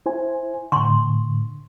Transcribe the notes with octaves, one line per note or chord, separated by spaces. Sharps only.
E4 C5 G#5
A2 D3 C6 C#6